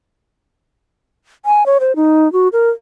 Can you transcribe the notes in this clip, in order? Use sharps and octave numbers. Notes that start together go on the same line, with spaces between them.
G#5
C#5
C5
D#4
F#4
A#4